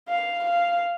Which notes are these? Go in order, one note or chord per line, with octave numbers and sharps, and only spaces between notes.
F5
F5